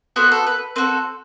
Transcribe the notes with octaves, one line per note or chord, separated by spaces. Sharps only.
B3 F#4 A4 C5
A4
B4
C4 F#4 A4 B4